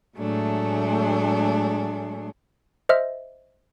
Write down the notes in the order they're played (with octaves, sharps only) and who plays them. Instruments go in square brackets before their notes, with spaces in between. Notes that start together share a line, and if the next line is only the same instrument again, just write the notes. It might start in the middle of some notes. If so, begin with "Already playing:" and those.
[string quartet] A2 F#3 G#3 A3 D4 G#4
[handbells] C5 D#5 E5 F6